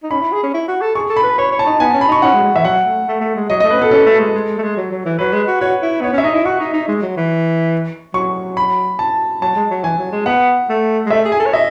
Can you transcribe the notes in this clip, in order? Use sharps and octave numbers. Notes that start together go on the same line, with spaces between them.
D#4
C#4 B5
E4
G#4
C#4
E4
F#4
A4
G#4 C#6
A4
B5
B4
C#5 B5
C#5
A5
D#4
B3 G#5
C#4 A5
B5
D#4 C#6
C#4 F#5
G#3
G#3
E3 E5
F#3 F#5
A3
A3
A3
G#3
F#3 D#5
A3 D#5
C#4 B4
B3 A4
C#4 A4
A3
G#3
G#3
G#3
A3
G#3
F#3
F#3
E3
F#3 B4
G#3
F#4
F#4 C#5
E4
B3 C#5
C#4 E5
D#4 D#5
E4
F#4 C#6
D#4
D#4
G#3
F#3
E3
F#3 C#6
B5
A5
F#3 A5
G#3
F#3
E3 G#5
F#3
G#3
B3 F#5
A3
G#3
A3 E5
G#4
G#5
A4
C#5
D#5 E5